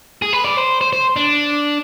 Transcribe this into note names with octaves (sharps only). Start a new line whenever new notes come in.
G#4
B4
D5
C5
C5
C5
D4